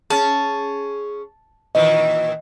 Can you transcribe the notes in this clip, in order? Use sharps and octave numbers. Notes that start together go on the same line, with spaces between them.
C#4 G#4 A5
A#2 D#3 E3 D#5